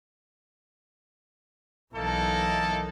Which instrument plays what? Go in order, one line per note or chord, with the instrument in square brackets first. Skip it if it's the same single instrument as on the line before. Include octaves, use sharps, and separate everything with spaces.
[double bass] B1 E3 [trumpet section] A#3 D#4 A4